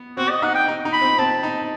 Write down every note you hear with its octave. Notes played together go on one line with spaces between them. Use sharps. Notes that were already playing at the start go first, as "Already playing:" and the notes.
Already playing: B3
C4 F#4
D#5
D#4 F#5
G5
D#4
D#4
B5
C4
C4 A5
D#4